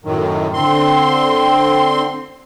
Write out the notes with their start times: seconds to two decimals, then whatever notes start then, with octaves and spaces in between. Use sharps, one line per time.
0.05 F#2 A2 D#3 F#3
0.54 D3 C4 C6